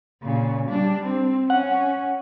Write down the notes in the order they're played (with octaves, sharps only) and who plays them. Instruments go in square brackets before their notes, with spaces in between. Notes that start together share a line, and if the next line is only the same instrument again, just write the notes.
[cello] A#2 C#3
G3 D4
C4
[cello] C#4 [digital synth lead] F#5